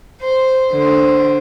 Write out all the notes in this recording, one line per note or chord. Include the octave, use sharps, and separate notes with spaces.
C5
D3 C5